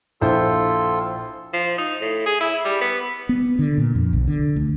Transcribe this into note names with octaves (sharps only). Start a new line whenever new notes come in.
A#1 E4 F4 A4 C5
F3
D#4
A2
G#4
E4
G3
B3
B3
D3
A#2
F2
B1
D3
D2